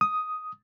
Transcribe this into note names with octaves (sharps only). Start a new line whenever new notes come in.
D#6